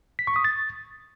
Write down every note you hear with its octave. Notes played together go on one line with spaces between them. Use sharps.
B6
C#6
D#6
A6